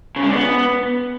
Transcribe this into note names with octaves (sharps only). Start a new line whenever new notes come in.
C#3
G#3
D3
B3